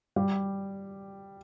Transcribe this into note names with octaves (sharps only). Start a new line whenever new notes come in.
G3